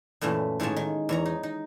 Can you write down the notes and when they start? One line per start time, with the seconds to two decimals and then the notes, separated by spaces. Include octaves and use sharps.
0.21 F#2 A#2 E3 A3
0.60 A2 D#3 G#3 A#3 C#5 A5
0.76 D#3
1.09 E2 C#5 A#5
1.26 D#4
1.43 D#4